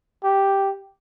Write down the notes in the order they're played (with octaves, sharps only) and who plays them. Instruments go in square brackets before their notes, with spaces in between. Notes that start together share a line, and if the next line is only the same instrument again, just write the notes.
[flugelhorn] G4